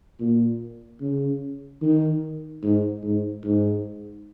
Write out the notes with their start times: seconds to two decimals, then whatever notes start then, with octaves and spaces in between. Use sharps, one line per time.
0.20 A#2
1.01 C#3
1.82 D#3
2.63 G#2
3.03 G#2
3.44 G#2